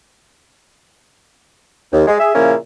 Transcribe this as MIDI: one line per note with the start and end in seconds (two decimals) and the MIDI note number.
1.93 2.02 39
2.07 2.19 56
2.19 2.31 68
2.19 2.31 76
2.35 2.55 46
2.35 2.55 49
2.35 2.55 53
2.35 2.55 58
2.35 2.55 61
2.35 2.55 64